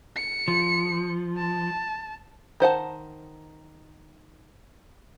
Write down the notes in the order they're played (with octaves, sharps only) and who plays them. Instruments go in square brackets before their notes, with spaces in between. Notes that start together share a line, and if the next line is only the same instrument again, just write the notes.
[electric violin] C#7
[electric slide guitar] F3
[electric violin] A5
[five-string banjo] D#3 C5 F#5 A5